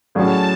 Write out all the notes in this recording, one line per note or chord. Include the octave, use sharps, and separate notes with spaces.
A2 F#3 C#4 G#4 D5 A5